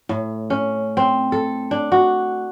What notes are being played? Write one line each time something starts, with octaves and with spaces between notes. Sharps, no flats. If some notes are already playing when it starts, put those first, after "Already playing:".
A2
C#4
C4
A4
D4
F#4